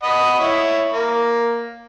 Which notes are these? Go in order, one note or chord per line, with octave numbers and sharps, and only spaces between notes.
D#5 F#5 B5
E4 C#5
A#3